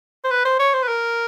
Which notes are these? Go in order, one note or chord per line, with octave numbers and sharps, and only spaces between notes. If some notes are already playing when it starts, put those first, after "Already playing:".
C5
B4
C5
C#5
C5
B4
A#4